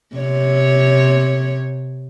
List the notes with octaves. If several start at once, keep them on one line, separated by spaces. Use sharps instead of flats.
C3 C#5